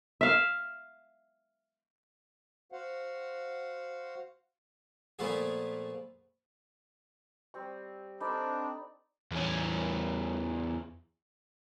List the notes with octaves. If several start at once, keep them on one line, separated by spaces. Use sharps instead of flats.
E5 F5
F#4 C5 F5 F#5
A#2 F3 A3 B3 G#4
G3 C4 C#6
C4 D4 D#4 A4 D5 B5 D6
E2 C#4